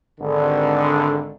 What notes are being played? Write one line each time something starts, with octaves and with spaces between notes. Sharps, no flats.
G#1 D3